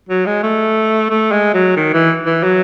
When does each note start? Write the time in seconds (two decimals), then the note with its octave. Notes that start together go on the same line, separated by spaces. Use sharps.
0.09 F#3
0.26 G#3
0.43 A3
1.10 A3
1.32 G#3
1.54 F#3
1.76 D#3
1.93 E3
2.26 E3
2.44 F#3